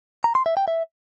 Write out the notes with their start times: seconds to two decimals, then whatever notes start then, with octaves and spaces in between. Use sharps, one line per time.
0.24 A#5
0.35 C6
0.46 E5
0.57 G5
0.68 E5